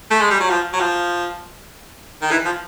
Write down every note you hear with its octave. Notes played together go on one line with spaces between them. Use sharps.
A3
G#3
G3
F#3
F3
F#3
F3
D#3
E3
F3